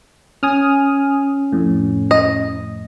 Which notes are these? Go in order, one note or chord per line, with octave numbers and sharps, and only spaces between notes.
C#4 G#5 D#6 F6
F2 A2
D#5